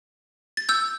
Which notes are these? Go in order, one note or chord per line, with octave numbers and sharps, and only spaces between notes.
A6
E6 G6